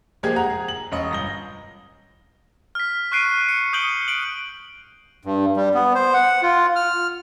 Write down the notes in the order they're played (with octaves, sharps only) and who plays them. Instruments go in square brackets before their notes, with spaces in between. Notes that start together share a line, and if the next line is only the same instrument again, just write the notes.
[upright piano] F3 G#3 A#3 G4 G#4 G#6
F#5 A#5
G#4
F#7
E1 C#4 D#5
G1 A#6 G7
[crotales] F6 B6
C#6 F6 F#6 C7 D7 D#7
C#7
D#6 G6 C#7 D7 F#7 G7
D7 F#7
[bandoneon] G2
G3
B3
C5
F#5
F4
F6